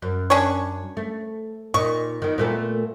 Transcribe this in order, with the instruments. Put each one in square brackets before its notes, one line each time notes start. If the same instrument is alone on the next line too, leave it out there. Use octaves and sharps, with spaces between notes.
[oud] F#2
[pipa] C#4 D4 C#5
[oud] A3
[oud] A#2 D#4 [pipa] C#6
[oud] D#3 B3
A#2 A3 B3